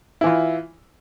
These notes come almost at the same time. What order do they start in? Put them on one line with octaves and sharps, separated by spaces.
E4 E3 F4